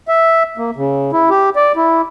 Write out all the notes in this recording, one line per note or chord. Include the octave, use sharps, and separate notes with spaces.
E5
A#3
C#3
E4
G4
D5
E4